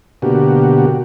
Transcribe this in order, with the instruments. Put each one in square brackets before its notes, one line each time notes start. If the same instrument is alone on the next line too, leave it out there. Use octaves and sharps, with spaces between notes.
[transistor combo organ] B2 D3 A#3 F#4 G4